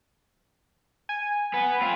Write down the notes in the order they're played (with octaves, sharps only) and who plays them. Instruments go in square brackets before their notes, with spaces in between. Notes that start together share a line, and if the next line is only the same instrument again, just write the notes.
[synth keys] G#5
[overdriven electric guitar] B3
C4 F4